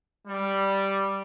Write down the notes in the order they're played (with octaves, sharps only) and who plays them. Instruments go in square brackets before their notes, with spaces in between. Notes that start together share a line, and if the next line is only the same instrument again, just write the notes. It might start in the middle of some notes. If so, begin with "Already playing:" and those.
[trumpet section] G3